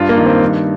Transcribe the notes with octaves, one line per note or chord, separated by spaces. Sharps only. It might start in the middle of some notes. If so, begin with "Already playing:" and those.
Already playing: G2 F4
A#3
D#3
C4
G2